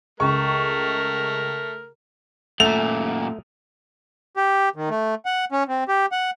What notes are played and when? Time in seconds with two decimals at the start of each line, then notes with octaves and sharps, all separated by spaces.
0.20 C#2 A3 A#4 C#6
2.60 F#2 A#2 A3 F7
4.37 G4
4.76 D#3
4.89 A3
5.26 F#5
5.52 C#4
5.68 C4
5.89 G4
6.12 F#5